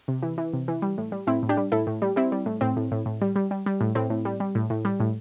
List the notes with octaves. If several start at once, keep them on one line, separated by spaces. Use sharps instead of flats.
C3
E3
E3
C3
E3
G3
A2
G3
A2 C4 E4
A2
D4 G4
G3
A2 E4 A4
A2
G3
G3 C4 E4
G3
A2
A2 C4
A2
A2
A2
G3
G3
G3
G3
A2
A2 C4
A2
G3
G3
A2
A2
G3
A2